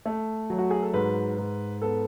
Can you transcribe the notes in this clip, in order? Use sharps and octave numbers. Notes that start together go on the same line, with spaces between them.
A3
F#3
F#4
G#4
A4
G#2 B4
G#2
B3 A4